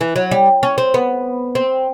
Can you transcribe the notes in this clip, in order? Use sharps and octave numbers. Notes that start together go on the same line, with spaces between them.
E3
F#3
G3
C#4
C4
B3
C4